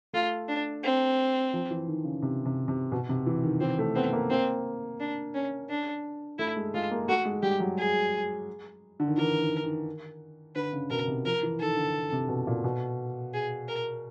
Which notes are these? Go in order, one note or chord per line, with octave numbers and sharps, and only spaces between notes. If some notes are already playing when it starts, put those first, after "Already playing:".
A3 F4
D4
C4
F3
E3
D#3
C#3
C3
C3
C3
B2
C3
E3
D#3
E3 C4
A3
B3 C4
A#3
A#3 C4
D4
C#4
D4
A3 E4
G#3
G#3 F4
A#3
A3 F#4
G#3
G3 G4
F#3
G#4
D3
D#3
E3 A#4
D#3
D#3
D3 B4
C#3
B2 A#4
C3
F3 A#4
E3
D#3 A4
D3
C3
B2
A#2
B2
G#4
A#4